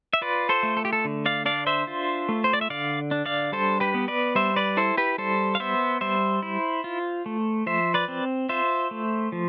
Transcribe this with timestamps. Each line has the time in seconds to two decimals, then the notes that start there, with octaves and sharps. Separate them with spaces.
0.13 E5
0.21 F4 B4 D5
0.49 A4 C5
0.63 A3
0.77 A4
0.85 G4
0.93 A4
1.05 D3
1.26 D5 F5
1.45 D4 D5 F5
1.67 C5 E5
1.87 F4
2.29 A3
2.44 C5
2.53 D5
2.61 E5
2.70 D3 D5 F5
3.11 D4
3.26 D5 F5
3.52 G3 A4 C5
3.80 G4 B4
3.94 B3
4.08 B4 D5
4.35 G3 C5 E5
4.56 B4 D5
4.77 E4 A4 C5
4.97 G4 B4
5.18 G3 A4 C5
5.55 F5
5.60 B3 C5 E5
6.01 G3 C5 E5
6.43 E4
6.84 F4
7.26 A3
7.66 F3 C5 E5
7.94 B4 D5
8.08 C4
8.49 F4 C5 E5
8.91 A3
9.32 F3